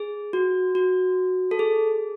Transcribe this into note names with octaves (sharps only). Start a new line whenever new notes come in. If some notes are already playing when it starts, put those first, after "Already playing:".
Already playing: G#4
F#4
F#4
A4
G#4